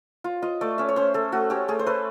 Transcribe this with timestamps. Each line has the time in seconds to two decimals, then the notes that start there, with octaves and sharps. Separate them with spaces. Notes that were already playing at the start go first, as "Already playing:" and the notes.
0.24 F4
0.42 F4 D#5
0.61 A3 D5
0.78 C#4 E5
0.89 C#5
0.96 C#4 C5
1.14 A3 A4
1.32 A3 F#4
1.50 C#4 G4
1.68 A3 G#4
1.79 C5
1.86 A3 B4